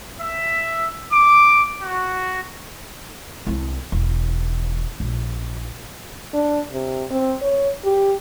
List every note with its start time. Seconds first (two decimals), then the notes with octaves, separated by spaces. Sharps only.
0.20 E5
1.11 D6
1.82 F#4
3.47 C2 E4
3.92 E1
5.00 A#1
6.34 D4
6.72 C3
7.11 C4
7.42 C#5
7.85 G4